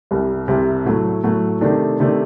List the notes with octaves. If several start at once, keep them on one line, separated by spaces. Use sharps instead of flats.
C2 C3 G3
C2 C3 G3
A2 F#3 A3
A2 F#3 A3
C3 D#3 A3 D4
C3 D#3 A3 D4